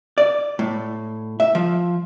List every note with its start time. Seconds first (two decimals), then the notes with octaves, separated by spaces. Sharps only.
0.18 D5
0.59 A2
1.40 E5
1.55 F3